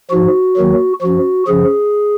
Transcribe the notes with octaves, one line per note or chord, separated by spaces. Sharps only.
G#2 F3 F#4
D#2 D#3 F#3
F#2 F3 F#4
F#2 C#3 F3 G#4